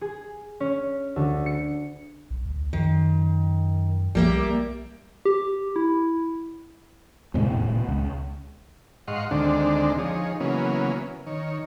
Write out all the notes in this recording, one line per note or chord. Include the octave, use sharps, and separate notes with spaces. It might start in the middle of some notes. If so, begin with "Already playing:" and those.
G#4
C#4
D2
C#7
B1
D2
F#2 D#3
B1 G3 A#3 E5
G4
E4
E2 A2 C3 G#3
D#1 A2
B2
C#2
G#2 D#5 F5 F#5 C6 C#6
D2 D3 D#3 G#3 C4 D4
F3 D#4 G#4 C#5
C#3 E3 F#3 A#3 B3 C#4
D#3 C#5